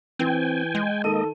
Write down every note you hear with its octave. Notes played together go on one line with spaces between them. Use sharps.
E3 C4 G5 G#5
G#3
D#3 A#3 A4 D#5 D#7